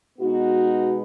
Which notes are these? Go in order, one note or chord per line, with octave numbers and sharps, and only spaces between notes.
B2 G#3 B3 D#4 F#4